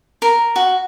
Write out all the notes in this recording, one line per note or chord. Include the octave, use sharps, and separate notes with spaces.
A#4
F#4